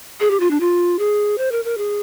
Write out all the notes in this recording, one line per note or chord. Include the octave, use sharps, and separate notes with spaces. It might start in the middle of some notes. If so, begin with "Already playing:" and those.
G#4
G4
F4
D4
F4
G#4
C5
A#4
A#4
G#4